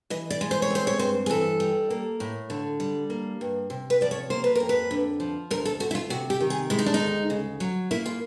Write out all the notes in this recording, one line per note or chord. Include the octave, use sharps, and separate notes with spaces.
E3 D#5
D5
G#3
C5
C#5
C4 C5
C#5
G2 C5
G#4
E3 A4
G3
A#3
A2
D3
G3
A#3
G2
C3
B4
F3 D5
C#5
A#3 C5
B4
F2 A#4
B4
D3
F3
D2 A#4
A4
D2 F#4
E4
F4
C3 F#4
G4
D#3
G#4
G#3 E4
D#4
D4
D#4
D2
C#3
F#3
A#3 E4
F4